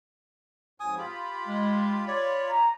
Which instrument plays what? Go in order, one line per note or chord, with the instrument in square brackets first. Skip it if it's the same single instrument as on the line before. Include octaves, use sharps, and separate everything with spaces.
[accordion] F2 G#2 F#3 [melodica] G#5 D#6
[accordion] F4 B5 [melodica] G4
[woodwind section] G#3
[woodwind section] C#5 [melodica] D5
[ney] A#5